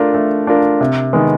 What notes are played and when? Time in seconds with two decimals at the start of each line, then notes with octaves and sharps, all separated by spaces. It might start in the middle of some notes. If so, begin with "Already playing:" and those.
Already playing: A3 D4 F4 A#4
0.14 A3
0.47 D4 F4 A#4
0.81 C3
1.13 D#3 G#3 B3